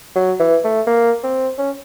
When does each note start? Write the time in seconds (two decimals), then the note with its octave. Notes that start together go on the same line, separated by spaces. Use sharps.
0.16 F#3
0.39 E3
0.64 A3
0.87 A#3
1.23 C4
1.58 C#4